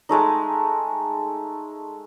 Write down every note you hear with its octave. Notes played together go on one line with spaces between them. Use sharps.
G#3 A3 D#4